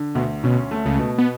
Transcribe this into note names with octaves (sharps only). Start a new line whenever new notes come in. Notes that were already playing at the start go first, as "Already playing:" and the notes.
Already playing: D3
D2 B2
B2 C#4
A3
C#2 C#3
B2
B3